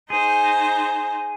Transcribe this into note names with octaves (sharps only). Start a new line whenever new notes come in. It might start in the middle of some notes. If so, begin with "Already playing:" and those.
D#4 G#4 C5